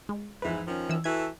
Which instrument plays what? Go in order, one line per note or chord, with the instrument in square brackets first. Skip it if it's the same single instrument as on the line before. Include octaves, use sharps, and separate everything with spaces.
[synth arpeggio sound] G#3
[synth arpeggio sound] F2 B4 [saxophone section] G#2 E3
[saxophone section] D#3 F3 C#4
[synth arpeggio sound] E3 E6
[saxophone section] E3 F#4 A4 [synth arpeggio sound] G#6